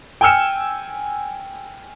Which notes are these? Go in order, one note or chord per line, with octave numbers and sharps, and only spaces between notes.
G5 G#5 E6 F6 C#7 E7